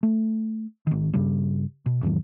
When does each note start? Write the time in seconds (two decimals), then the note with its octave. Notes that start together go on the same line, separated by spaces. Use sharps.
0.03 A3
0.87 G#1 D#3
1.14 G2 C#3 G3
1.86 B2
2.03 E2 G#2 D#3 F#3